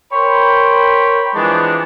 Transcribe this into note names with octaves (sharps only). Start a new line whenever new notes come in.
A#4 C5 C#5 G5 B5
E3 F3 G#3 B3 D4